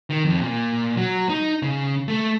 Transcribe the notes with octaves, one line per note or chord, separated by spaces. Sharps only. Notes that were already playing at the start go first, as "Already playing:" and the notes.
D#3
F2
A#2
F#3
D#4
C#3
A3